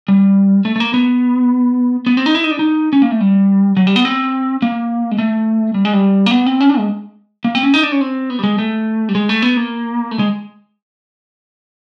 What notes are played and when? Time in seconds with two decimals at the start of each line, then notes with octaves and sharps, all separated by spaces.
0.08 G3
0.65 A3
0.76 A3
0.80 A#3
0.94 B3
2.07 B3
2.17 C4
2.26 D#4
2.35 E4
2.44 D#4
2.51 D4
2.59 D#4
2.93 C#4
3.02 A#3
3.11 A3
3.20 G3
3.77 F#3
3.87 G3
3.96 B3
4.05 C4
4.62 A#3
5.11 G#3
5.18 A3
5.74 G3
5.85 G#3
5.93 G3
6.26 A#3
6.31 B3
6.46 C4
6.60 C#4
6.69 D4
6.78 G#3
7.45 A#3
7.55 C4
7.63 C#4
7.74 D#4
7.83 D4
7.92 C#4
8.01 C4
8.30 B3
8.39 G3
8.44 G#3
8.58 A3
9.09 G3
9.15 G#3
9.29 A3
9.42 B3
9.57 A#3
10.11 A3
10.19 G#3